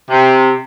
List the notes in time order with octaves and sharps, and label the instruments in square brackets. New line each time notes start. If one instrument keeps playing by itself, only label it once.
[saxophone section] C3